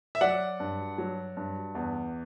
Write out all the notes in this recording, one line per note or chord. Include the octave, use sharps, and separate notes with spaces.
E5
F#3 D5 F#5
G2
F#3
G2
E2